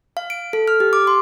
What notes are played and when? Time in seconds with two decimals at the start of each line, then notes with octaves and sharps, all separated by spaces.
0.17 F5
0.30 D7
0.53 A4
0.68 F6
0.80 G4
0.93 D6
1.07 C6